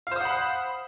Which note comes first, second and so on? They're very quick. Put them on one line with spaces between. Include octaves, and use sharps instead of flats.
F5 C5 D#6 F#5 B5